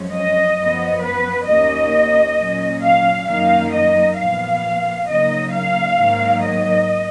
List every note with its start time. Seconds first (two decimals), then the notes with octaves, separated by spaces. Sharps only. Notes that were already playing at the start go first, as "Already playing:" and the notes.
Already playing: F#2 F3 G#3 C#4
0.12 D#5
0.57 F#2 F3 B3
1.02 B4
1.47 D#2 D#3 A#3 C#4 D#5
2.37 A#2 F#3 C#4
2.82 F5
3.27 F#2 D#3 A#3 D#4 F5
3.73 D#5
4.17 A#2 F3 B3 F5
5.08 C#3 F#3 A#3 D#4 D#5
5.53 F5
5.98 G#2 D#3 F#3 A#3
6.43 D#5